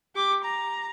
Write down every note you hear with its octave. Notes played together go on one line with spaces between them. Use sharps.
G4 D6
A#5